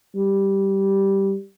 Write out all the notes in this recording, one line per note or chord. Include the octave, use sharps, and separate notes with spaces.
G3